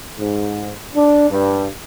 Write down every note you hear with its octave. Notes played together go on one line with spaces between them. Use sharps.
G#2
D4
G2